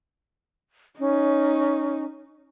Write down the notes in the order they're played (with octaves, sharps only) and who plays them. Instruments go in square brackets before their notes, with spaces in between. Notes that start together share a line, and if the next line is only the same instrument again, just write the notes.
[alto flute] C#4 [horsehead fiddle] D#4